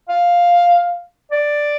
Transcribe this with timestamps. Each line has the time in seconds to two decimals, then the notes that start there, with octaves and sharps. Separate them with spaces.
0.09 F5
1.32 D5